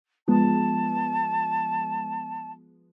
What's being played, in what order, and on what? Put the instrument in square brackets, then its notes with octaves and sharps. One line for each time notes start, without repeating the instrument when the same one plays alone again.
[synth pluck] F3 G#3 B3 [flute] A5